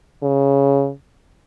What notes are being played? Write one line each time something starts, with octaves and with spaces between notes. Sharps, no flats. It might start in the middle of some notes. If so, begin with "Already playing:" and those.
C#3